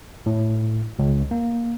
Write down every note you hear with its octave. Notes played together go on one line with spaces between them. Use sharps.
A2
C#2
A#3